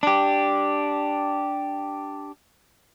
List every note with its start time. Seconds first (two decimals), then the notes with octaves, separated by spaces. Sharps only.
0.03 D4 G4